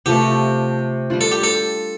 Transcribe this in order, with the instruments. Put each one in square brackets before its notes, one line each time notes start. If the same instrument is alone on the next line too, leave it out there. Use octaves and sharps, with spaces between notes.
[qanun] C3 F3 A3 [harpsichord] G4
[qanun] G3 D4 F4
[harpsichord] A4
G4
A4